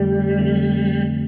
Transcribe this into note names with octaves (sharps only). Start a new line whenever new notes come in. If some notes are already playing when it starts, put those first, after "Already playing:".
Already playing: F2 D3 G3 A3
F2 D3 A3